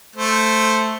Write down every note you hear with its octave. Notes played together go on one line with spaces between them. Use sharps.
A3 C5